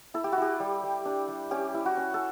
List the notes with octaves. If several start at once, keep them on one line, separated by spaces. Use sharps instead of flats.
E4 A4
G4
F#4
E4 G4
G3
G3
D4
G3
C#4 G4
E4
F#4
C#4
A4